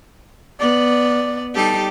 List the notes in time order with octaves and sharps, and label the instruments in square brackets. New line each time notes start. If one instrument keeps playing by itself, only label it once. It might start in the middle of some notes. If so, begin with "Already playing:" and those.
[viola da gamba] B3 [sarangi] D5
[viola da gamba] G3 D#4 G4 [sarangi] A4